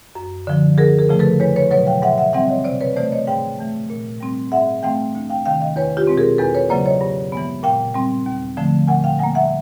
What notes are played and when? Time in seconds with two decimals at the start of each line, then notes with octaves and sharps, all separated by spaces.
0.15 F#2
0.47 D3 F3
0.78 D2 G#4 A#4
0.99 G#4 A#4
1.09 C#3 F3 A3
1.19 A4 B4
1.40 E2 B4 C#5
1.56 B4 C#5
1.71 B2 F#3 B4 C#5
1.87 F5 G5
2.02 G#2 E5 F#5
2.18 E5 F#5
2.33 E3 G3 C4 E5 F#5
2.49 C#5 D#5
2.64 C3 C5 D5
2.80 B4 C#5
2.96 E3 A3 C5 D5
3.12 C#5 D#5
3.27 G#2 F5 G5
3.59 E3 A3
3.90 A#2
4.20 G3 C4
4.52 G#2 E5 F#5
4.82 E3 A3 C4 F5 G5
5.15 D2
5.30 F5 G5
5.45 C3 D#3 F5 G5
5.61 D#5 F5
5.76 E2 B4 C#5
5.97 F4 G4
6.07 B2 G#3 C4
6.18 G#4 A#4
6.38 E2 A4 B4
6.55 B4 C#5
6.69 C#3 F#3 A#3 C5 D5
6.85 C#5 D#5
7.01 G2
7.32 E3 G#3 B3
7.63 A#2 F5 G5
7.94 G3 C4
8.26 D#2
8.57 D3 F3 A3
8.88 A#2 F#5 G#5
9.04 F5 G5
9.19 G3 A#3 F#5 G#5
9.35 E5 F#5